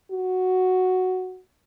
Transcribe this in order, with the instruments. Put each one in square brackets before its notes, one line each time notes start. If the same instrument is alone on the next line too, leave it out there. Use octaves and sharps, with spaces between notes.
[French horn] F#4